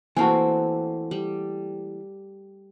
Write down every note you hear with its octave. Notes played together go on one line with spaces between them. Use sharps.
E3 A3 A#3 C4 F#4 G#5 A5
G3